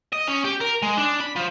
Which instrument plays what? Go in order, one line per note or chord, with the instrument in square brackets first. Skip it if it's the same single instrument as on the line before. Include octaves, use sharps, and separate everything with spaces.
[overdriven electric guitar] D#5
C#4
G4
A#4
G#3
D4
B5
F3